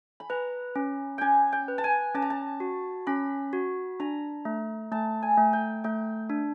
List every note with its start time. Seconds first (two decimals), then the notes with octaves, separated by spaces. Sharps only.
0.20 B5
0.30 B4 A#5
0.76 C#4
1.18 C#4 G5 G#5
1.53 G5
1.68 B4
1.78 A5
1.84 G#5
2.15 C#4 A5
2.22 A#5
2.30 A5
2.60 F#4
3.07 C#4 B5
3.53 F#4
4.00 D4 A#5
4.45 A3
4.92 A3 A5
5.22 G#5
5.37 A3
5.53 G5
5.84 A3 G5
6.30 D4